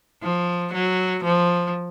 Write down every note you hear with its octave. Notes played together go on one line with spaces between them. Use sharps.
F3
F#3
F3